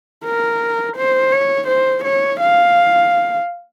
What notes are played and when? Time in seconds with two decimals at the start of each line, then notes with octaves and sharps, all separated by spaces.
0.25 A#4
0.97 C5
1.32 C#5
1.68 C5
2.04 C#5
2.40 F5